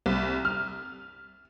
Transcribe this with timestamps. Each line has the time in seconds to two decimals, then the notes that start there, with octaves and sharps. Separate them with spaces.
0.06 C2
0.45 F6